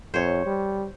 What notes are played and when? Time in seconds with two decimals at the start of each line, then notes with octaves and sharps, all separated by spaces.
0.14 F2 C5 C#5
0.46 G3